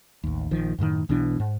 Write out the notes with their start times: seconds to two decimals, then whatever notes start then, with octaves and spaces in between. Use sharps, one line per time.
0.24 A1 D#2
0.51 A#1 D#3 F3
0.78 F#2 A2 C3 D#3
1.09 B1 B2 E3 D4
1.40 G#2